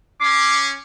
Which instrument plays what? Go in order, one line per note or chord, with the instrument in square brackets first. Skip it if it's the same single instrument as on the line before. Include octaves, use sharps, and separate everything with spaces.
[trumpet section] C#4 [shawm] D6 [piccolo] C7